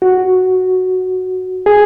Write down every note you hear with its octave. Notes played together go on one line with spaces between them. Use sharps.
F#4
G#4